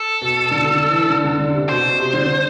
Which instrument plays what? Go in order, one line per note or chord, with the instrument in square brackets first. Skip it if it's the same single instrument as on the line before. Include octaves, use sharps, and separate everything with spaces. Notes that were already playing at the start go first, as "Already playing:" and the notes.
Already playing: [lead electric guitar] A4
[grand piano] B2
D3
D3
E3
D3
D3
D3
C3
[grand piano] B2 [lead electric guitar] C5
[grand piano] B2
C3
D3